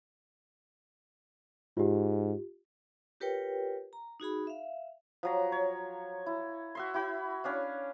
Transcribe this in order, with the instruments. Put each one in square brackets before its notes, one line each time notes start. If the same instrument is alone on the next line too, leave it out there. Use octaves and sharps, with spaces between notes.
[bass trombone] G#2 [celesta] F4 G4
[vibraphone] F4 G4 A#4 B4 C#5 G5
A#5
D#4 F#4 G#4 B5
E5 F5
[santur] F3 F#3 A#5
C#5
E4
F#4 E5 C6
E4 F#4 B5
C#4 D4 F5